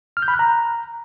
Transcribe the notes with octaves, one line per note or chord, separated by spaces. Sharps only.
F6
G6
B5
F#6
A#5